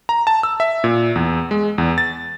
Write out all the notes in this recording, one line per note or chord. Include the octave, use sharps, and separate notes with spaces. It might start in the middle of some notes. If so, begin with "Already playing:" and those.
A#5
A5
E6
E5
A#2
E2
G#3
E2
A6